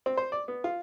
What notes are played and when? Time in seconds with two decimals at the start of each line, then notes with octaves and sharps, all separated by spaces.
0.06 C4
0.17 C5
0.32 D5
0.48 B3
0.64 F4